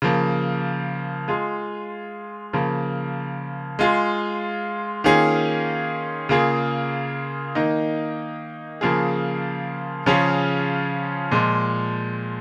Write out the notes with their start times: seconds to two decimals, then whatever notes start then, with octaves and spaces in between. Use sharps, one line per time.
0.02 C#3 F3 A#3
1.28 G#3 F4 G#4
2.53 C#3 F3 A#3
3.79 G#3 F4 G#4
5.04 D#3 A#3 C#4 F4 G#4
6.29 C#3 A#3 F4 G#4
7.55 D#3 A#3 D#4
8.81 C#3 F3 A#3 F4 G#4
10.06 C#3 F3 C#4 F4 G#4
11.32 A#2 F3 G#3